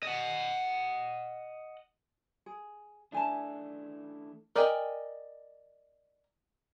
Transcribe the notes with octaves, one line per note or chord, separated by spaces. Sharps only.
D#5 F#5
G#4
E3 A3 D4 E4 G#5 A5
A#4 D5 D#5 G5 G#5